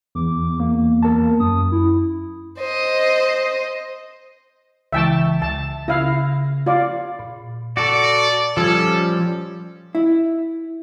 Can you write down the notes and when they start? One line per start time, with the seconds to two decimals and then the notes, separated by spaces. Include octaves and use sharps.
0.15 E2 D6
0.60 A#3
1.03 E2 A#4 A5
1.40 F#2 D#6
1.72 E4
2.58 C5 D#5
4.93 C#2 E3 E5 G5 A5 C#6
5.42 C#2 E5 A5
5.88 C#3 E4 F5 A#6
6.66 F4 D5
7.19 A#2
7.77 F#4 A4 D5
8.57 F3 G3 C#4 F4 A4 G#6
9.95 E4